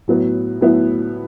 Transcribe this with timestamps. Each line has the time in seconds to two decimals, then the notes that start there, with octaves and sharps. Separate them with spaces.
0.08 A2 F#3 B3 E4
0.61 A2 F#3 B3 E4